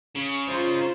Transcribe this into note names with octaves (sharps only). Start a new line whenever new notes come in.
C#3
D#4 F4 C5